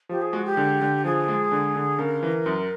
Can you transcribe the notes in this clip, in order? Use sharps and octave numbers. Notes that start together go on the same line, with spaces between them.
F3 G4
G#4
G#3 F#4
G4
D3
D3
F3 G#4
G#3
D3
D3
C#3 A#4
E3
F#2